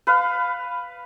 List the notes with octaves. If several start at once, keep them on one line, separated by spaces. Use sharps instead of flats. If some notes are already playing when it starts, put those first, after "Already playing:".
B4 F5